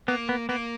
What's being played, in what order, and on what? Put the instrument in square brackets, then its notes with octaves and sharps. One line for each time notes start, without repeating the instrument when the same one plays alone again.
[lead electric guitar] A#3 [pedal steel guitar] B3
[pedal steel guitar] B3
[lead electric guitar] A#3 [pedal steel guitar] B3